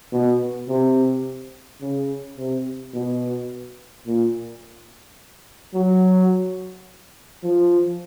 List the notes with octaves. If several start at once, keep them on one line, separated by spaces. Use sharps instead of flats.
B2
C3
C#3
C3
B2
A#2
F#3
F3